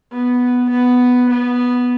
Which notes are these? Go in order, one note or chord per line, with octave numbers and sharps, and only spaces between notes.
B3
B3
B3